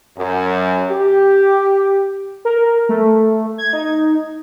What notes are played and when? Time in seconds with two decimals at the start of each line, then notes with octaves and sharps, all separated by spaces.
0.18 F#2
0.90 G4
2.45 A#4
2.89 A3
3.58 G#6
3.73 D#4